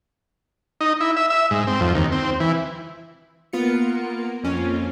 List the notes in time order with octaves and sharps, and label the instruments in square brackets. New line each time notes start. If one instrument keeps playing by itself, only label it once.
[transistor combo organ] D#4
E4
E5
E5
G#2
C4
F2
D#2
C4
E3
[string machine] A#3 A#4 [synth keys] B3 F4 C#7
[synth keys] F2 C#4 [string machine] A#3 C4 F4